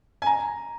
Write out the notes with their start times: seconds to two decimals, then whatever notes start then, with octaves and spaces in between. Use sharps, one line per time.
0.22 G#5
0.26 A#5